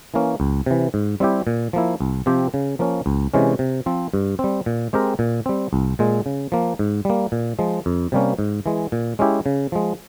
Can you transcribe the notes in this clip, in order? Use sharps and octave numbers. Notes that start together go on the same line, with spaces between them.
E3 A#3 C#4
C#2
C3 E3
G#2
G3 C4 E4 G4
A#2
F3 A#3 E4
C2
C3 F3 C4 G4
C#3
F3 A#3 C#4
C#2
C3 E3 G#3 C#4
C3
F3 C4
G2
G3 C4
A#2
G#3 C4 G4 A#4
A#2
G3 C4
C2
A#2 G#3
C#3
F3 A#3
G#2
G3 A#3
A#2
F3 G#3
F2
C3 G3 A#3 C#4
G#2
E3 G#3
A#2
G#3 C#4 E4 G4
C#3
F3 G#3